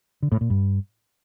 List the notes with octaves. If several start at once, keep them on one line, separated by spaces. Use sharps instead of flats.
D3
A2
A#2
G2